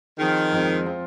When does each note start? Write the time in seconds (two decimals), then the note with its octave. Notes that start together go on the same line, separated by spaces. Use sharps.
0.18 D#3 F3 C4 G#4
0.52 F2 F3 G#3 C4
0.86 F3 C4 F4